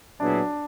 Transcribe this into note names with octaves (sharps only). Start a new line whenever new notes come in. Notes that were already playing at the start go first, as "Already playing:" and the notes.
A#2 F#3 B3 D4 E4 G#4